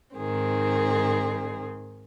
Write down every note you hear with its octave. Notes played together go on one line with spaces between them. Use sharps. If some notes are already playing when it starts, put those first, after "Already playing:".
G#2 D#3 C4 G#4